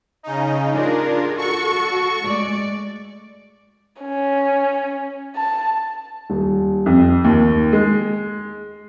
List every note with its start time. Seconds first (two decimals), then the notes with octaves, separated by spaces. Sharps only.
0.23 C#3 D#4
0.73 D4 F4 G#4 A#4
1.37 F#4 A4 C#6
2.25 G#3 A3 D5
4.02 C#4
5.36 A5
6.30 D#1
6.86 F2
7.24 D#2
7.73 G#3